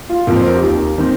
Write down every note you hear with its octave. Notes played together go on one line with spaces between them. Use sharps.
F4
F2 F3 A#3 A#4
C5
A#4
G4
D#2 D#3 A#3
D#3 C4